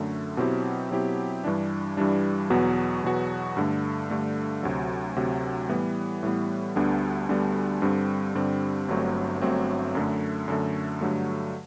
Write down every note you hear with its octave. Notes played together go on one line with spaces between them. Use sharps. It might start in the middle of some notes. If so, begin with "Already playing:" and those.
Already playing: F#2 D3 A3
B2 F#3 C4 E4 G4
B2 F#3 C4 E4 G4
G2 E3 G3 D4
G2 E3 G3 D4
E2 B2 F#3 B3 F#4
E2 B2 F#3 B3 F#4
G2 D3 A3
G2 D3 A3
D2 C3 F#3
D2 C3 F#3
A2 E3 G3 B3
A2 E3 G3 B3
D2 D3 G3 B3 D4
D2 D3 G3 B3 D4
G2 D3 G3 C4
G2 D3 G3 C4
G1 G2 F#3 A3 C4
G1 G2 F#3 A3 C4
F#2 D3 A3
F#2 D3 A3
G2 D3 F#3 A3